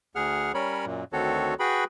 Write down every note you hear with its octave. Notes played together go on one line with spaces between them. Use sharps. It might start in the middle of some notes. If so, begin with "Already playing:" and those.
D2 G#4 F#5 F6
G3 C#4 A#4 C#5 B5
F#2 A#2
D2 D#3 C4 F#4 A4 C#5
F#4 G#4 B4 G5 B5